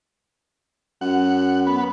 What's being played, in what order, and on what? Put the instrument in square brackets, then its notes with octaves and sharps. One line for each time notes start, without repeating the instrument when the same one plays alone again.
[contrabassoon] F#2 [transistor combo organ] F#5
[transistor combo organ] B3